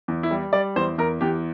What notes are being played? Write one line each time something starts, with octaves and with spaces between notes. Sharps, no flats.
E2
E4
G3
G3 D5
E2 C5
E2 A#4
E2 G4